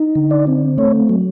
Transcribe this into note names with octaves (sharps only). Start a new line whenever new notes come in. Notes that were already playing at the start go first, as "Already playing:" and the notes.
Already playing: D#4
D3
D5
C4
A3 C#5
F#3